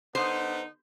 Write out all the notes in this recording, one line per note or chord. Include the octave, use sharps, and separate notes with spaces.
D3 B3 D#4 C5